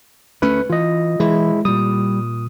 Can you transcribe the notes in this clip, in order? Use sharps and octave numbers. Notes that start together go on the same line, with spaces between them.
D2 A3 C#4 B4
E3 F4 D#5
E3 G#3 E4
A#2 G3 D#6